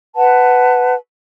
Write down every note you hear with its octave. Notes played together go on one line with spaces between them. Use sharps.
B4 F#5 A5